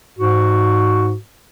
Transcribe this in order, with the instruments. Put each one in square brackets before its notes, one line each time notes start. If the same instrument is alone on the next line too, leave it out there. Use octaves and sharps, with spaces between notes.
[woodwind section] G#2 F#4